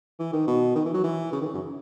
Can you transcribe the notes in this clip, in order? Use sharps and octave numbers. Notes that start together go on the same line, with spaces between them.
E3
D#3
B2
D#3
E3
F#3
E3
C#3
D#3
C#3
F#2